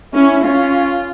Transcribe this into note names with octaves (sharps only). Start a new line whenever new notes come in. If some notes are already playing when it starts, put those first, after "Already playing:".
C#4 E4
C#4 F4